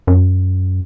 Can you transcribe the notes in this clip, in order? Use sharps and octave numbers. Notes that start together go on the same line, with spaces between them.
F#2